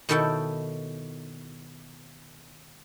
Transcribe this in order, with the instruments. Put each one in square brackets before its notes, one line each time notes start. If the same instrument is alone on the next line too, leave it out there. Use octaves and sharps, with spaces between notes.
[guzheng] B2 D#3 E4 A4 C#5 G5